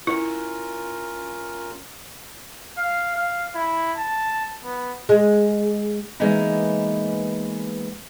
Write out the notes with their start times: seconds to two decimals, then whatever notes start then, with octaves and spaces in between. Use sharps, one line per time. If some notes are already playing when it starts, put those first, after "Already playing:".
0.07 C#4 E4 F4 A#4
2.78 F5
3.15 F5
3.55 E4
3.97 A5
4.64 B3
5.09 G#3
6.20 E3 G#3 A#3 B3 D#4